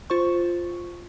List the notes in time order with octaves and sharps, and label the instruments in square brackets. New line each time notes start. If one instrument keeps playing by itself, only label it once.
[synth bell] F4 C5 C#6